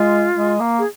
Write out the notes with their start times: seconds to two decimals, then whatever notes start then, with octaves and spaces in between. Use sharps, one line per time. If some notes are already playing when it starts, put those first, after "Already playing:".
Already playing: G#3 F4
0.34 G#3
0.60 A#3
0.79 G#4